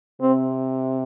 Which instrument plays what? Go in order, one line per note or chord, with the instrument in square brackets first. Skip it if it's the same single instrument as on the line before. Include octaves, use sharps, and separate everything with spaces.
[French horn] C3 [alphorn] C4